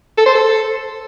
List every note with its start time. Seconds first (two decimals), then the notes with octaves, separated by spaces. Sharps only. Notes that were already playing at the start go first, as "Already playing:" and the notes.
0.17 A4
0.26 C5
0.35 A4